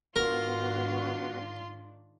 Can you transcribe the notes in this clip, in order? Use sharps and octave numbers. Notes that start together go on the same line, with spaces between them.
G#2 D#3 B3 D4 F4 F#4 A#4 C6